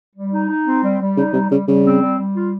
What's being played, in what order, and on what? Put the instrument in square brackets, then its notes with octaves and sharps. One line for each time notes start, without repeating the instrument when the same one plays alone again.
[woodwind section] G3
D#4
D#4
C4
G3
G3
[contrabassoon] C#3 [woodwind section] D#4
[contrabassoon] C3 [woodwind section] G3
[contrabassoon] C#3 [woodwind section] G3
[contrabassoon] C#3 [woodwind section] G3
[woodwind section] C4
G3
G3
F4